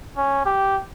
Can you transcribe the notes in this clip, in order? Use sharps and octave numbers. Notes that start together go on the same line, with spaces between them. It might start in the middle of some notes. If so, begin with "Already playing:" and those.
C#4
G4